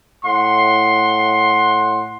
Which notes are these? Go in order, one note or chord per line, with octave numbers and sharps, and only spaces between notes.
A2 F#5 C6